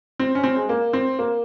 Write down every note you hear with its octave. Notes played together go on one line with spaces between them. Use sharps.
C4
C#4
C4
G#3
A#3
C4
A#3